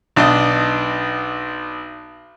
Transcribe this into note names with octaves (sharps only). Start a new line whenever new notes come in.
B1 D4 D#5